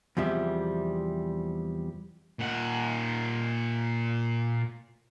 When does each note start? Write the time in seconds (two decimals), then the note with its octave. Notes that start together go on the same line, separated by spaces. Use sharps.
0.17 E2 C3 F3 G3 E5
2.39 A#2 F#5